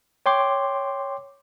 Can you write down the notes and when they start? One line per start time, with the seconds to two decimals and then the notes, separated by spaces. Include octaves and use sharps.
0.26 C#5 G5 C6 D6